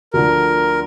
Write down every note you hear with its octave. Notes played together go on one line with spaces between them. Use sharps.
D2 D3 F3 A#4